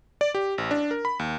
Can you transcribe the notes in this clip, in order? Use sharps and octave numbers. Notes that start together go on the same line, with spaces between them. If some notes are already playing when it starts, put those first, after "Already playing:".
D5
G4
A1
D4
A#4
B5
D#2